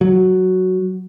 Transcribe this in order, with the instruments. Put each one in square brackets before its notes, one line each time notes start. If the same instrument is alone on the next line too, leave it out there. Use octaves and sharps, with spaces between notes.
[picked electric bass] F#3